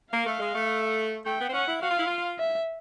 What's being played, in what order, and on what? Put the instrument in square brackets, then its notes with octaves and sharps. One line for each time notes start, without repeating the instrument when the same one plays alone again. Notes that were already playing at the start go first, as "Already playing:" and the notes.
[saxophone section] A#3 [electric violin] F5
[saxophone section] A3
G#3
A3
[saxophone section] A3 [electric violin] G5
[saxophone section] B3
C4
[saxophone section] C#4 [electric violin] F#5
[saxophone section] E4
[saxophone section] F#4 [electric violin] F5
[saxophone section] F4
E4
F4
[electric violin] E5